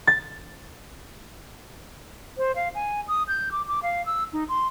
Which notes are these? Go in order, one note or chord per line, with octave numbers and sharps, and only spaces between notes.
A6
C5
F5
G#5
D#6
G6
D6
D6
F5
E6
D#4
C6